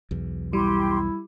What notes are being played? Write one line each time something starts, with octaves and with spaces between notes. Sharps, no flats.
B1 E2
G3 E4 G4 C6